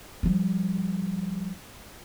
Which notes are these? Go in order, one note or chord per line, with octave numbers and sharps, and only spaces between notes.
F3 G3